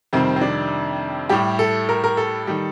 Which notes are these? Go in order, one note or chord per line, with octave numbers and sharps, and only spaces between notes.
F2 C3 D#3 G3 C4
C4
D4
A2 G3 G4
A4
A#4
A#4
A4
D#3 G3